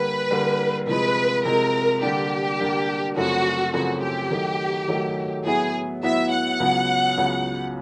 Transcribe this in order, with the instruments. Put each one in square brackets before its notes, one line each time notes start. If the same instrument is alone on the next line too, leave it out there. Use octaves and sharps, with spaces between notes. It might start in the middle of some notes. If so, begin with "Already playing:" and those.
Already playing: [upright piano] D3 G3 A#3 [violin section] B4
[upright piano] D3 G3 A#3
[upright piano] C3 F3 G#3 [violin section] B4
[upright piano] C3 F3 G#3 [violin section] A#4
[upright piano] D3 G3 A#3 D4 [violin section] G4
[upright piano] D3 G3 A#3 D4
[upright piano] F#2 C#3 F3 A3 C4 [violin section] F#4
[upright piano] F#2 C#3 F3 A3 C4 [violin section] F#4
[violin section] G4
[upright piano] D#3 F#3 A3
D#3 F#3 A3
[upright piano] A2 F#3 B3 E4 [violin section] G#4
[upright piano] A2 F#3 B3 E4 [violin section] E5
[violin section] F#5
[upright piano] C#2 C#3 F#3 B3
C#2 C#3 F#3 B3